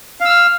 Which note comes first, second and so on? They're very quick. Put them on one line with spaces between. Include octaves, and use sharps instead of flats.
F5 E6 F6